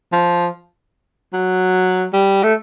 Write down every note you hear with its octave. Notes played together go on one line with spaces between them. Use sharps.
F3
F#3
G3
A3